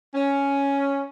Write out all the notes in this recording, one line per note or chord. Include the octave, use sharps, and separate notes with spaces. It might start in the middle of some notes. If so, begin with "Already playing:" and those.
C#4